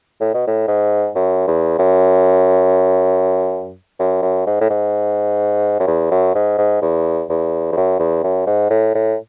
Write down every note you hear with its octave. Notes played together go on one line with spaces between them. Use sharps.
A2
B2
A2
G#2
F#2
E2
F#2
F#2
F#2
G#2
A2
G#2
F#2
E2
F#2
G#2
G#2
E2
E2
E2
F#2
E2
F#2
G#2
A2
A2